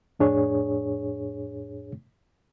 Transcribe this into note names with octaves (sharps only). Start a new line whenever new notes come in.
F2 A2 D4 G#4 C#5